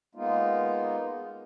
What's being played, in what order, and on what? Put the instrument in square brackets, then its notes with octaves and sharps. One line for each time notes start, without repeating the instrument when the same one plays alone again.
[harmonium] G#3 A#3 B3 D#4 F4